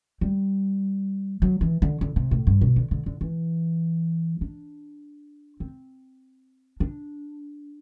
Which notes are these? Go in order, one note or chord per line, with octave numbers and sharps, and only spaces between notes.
G3
F#3
E3
D3
D3
C3
A2
G2
B2
D3
D3
D3
E3
D4
C4
D4